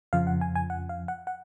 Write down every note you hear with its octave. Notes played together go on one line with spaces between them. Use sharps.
F2 C#3 F3 F5
F#5
G#5
G#5
F#5
F5
F#5
F#5